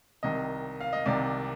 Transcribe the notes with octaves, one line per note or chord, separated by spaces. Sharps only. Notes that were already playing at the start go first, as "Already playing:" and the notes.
C2 C3 D#3 D#5
F5
D#5
C2 C3 D#3 D5